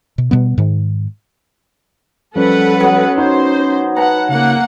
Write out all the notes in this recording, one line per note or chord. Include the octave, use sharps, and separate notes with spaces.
B2
B2 G3 B3
G#2 D#3
F3 G3 C#4 A4 B4 F#5
F#3 B3
D#4 F#4 C5 C#5
B4 F#5 A5 A#5
C#3 A#3 F#5